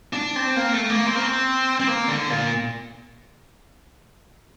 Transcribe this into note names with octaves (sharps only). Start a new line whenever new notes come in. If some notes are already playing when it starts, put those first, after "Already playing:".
D4
C4
A#3
A3
A#3
C4
A#3
C4
C4
A#3
D3
A#2